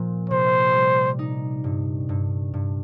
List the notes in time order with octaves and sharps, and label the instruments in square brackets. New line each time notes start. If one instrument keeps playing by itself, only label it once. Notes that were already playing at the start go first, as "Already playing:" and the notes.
Already playing: [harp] A#2 F3
[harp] C3 [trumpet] C5
[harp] G3
D#4
G2
G2
G2